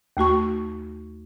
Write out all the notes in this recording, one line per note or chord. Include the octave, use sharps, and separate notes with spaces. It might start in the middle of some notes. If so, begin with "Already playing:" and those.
D#2 A3 F#4 C#6